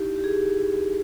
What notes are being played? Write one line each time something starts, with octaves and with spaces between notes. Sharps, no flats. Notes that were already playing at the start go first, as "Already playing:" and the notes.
Already playing: D#4 E4 G4
G4
G#4
G4